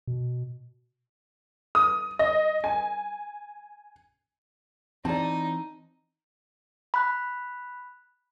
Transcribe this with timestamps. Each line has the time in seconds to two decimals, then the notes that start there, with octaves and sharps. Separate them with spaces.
0.07 B2
1.75 D#6
2.19 D#5
2.64 G#5
5.05 E3 C4 D#4 D5 A5
6.94 B5 F#6